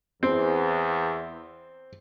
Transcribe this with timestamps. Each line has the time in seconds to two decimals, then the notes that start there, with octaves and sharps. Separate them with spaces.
0.23 E2 C4